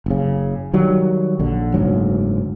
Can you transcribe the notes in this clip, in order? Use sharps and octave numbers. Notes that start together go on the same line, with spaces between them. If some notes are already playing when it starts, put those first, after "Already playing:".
F#1 C#3
D#3 F#3 G3
A#1 D3
F#1 D2 G#2 F#3